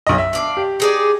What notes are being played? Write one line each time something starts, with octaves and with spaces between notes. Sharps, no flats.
B1 D#5
E5
D4 D5 F5
G4
D#4 G#4 D5